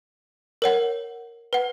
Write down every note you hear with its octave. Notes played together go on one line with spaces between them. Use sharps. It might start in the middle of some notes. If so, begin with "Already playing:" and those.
A#4 C#5 F#5
B4 F#5